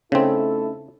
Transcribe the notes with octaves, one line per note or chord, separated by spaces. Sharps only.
C#3 A3 C4 C#4 D#4 E4 A4